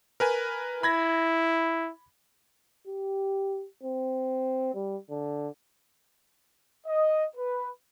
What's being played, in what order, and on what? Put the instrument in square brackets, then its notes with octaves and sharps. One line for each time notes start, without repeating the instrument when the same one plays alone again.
[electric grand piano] A#4 B4 G#5
[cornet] E4 [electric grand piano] B5 G#6 A#6
[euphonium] G4
C4
G3
D3
[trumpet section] D#5
B4